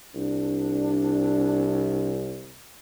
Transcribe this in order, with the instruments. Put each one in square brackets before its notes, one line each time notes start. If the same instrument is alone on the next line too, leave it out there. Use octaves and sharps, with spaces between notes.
[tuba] C2 [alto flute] D4